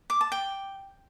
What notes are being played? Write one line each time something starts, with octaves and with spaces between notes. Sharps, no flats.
D6
A5
G5